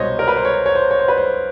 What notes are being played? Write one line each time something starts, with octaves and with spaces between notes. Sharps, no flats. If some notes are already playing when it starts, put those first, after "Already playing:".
Already playing: C2 B2 G#3 C5 C#5 D#5
A#4
B4
C5
C#5
C#5
C5
C#5
C5
B4
C5